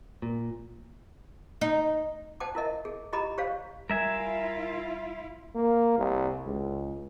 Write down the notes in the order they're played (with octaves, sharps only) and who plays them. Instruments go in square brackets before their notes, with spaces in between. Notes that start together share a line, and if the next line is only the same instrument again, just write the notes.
[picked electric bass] A#2
[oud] D#4
[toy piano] C5 G5 A5 D6
E4 A#4 D#5 E5
G#4
E4 G4 D#5 A#5 B5 D6
G4 C5 C#5 F5
[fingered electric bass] G3 [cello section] E4 F4 [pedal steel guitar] A#4 E5 G#5
[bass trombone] A#3
C2
C#2